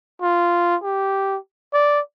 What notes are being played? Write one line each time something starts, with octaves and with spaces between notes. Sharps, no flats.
F4
G4
D5